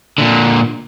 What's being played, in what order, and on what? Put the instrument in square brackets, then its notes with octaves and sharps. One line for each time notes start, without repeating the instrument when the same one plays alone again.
[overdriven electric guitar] A#2 D3